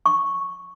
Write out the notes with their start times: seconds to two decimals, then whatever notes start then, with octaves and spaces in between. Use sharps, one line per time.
0.06 C#6